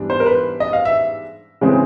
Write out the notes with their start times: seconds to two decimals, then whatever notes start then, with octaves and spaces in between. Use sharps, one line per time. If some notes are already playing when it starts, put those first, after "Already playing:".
Already playing: G#2 E3 G3 B3 D4
0.10 C5
0.20 A#4
0.26 B4
0.60 D#5
0.73 F5
0.85 E5
1.61 C#3 E3 G#3 C4